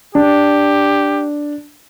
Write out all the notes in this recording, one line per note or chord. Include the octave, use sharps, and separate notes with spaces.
D4 G4